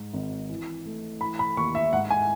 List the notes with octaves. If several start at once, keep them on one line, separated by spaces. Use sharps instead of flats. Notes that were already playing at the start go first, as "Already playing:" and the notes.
Already playing: G#2
G#1
E3
A3
E3 B5
B5
D#2 C#6
E5
G#2 F#5
G#5